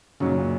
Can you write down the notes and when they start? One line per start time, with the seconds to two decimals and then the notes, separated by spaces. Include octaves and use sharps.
0.20 F#2 A#2 C#3 F#3 D#4
0.37 A#2